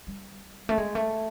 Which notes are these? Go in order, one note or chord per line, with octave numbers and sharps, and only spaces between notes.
G3
A3
G#3
A3